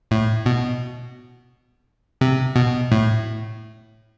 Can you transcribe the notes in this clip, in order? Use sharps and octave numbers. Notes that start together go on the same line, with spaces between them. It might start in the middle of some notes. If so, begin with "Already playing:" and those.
A2
B2
C3
B2
A2